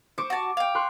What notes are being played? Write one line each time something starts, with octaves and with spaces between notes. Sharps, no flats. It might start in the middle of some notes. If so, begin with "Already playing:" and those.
C5 C#6 D6 C#7
F#4 A5
F5 G5
C6 C#6 F#6